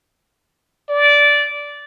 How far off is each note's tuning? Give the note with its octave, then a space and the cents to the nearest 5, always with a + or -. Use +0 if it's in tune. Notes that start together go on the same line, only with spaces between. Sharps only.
D5 -15